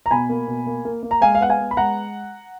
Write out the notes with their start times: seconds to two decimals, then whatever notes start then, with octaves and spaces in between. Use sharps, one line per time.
0.06 A#5
0.11 B2 G#5 B5
0.29 A#3
0.48 B2
0.67 A#3
0.85 A#3
1.03 A#3
1.11 A#5
1.21 G#3 F5 G#5
1.35 F5
1.40 B3 F#5
1.49 F5 G#5
1.58 B3
1.71 B5
1.77 G#3 F#5 A#5